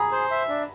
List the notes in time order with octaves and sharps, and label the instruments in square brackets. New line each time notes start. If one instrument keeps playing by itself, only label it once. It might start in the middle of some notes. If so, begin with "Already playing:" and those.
Already playing: [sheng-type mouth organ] G#4 [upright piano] G#5 A#5 B5
[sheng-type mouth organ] C5
E5
D4